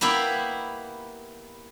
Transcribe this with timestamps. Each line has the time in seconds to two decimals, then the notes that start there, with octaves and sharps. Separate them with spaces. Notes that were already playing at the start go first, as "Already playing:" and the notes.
0.01 A#3 B3 E4 G4 D5 E5